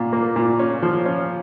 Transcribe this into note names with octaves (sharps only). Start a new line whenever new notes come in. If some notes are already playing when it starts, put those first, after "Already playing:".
Already playing: A#2 F4
A#3
A#2
C#4
F3
C#4